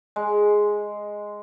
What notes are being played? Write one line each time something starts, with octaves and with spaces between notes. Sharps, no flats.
G#3